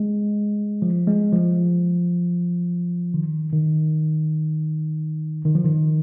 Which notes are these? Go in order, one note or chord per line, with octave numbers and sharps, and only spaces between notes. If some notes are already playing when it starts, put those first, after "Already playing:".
Already playing: G#3
F3
G#3
F3
D#3
D#3
D#3
F3
D#3